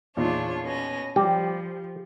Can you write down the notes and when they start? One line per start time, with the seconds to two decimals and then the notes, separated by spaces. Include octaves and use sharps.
0.17 E2 A#2 D4 D#4 F4 C#5
0.64 B2 C#4 A#6
1.16 F3 G3 G4